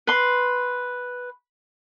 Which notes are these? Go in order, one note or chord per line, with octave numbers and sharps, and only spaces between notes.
B4 C6